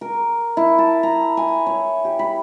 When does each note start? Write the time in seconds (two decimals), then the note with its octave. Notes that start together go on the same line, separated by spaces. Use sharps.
0.01 A#4
0.57 E4
0.78 A5
1.03 A#5
1.37 G#5
1.66 C#5
2.05 G4
2.19 B5